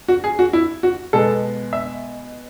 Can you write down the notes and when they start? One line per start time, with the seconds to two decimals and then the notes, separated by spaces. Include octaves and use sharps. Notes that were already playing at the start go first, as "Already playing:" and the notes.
0.08 F#4
0.24 G#4
0.39 F#4
0.53 E4
0.83 F#4
1.13 B2 G#3 B3 A4
1.73 E5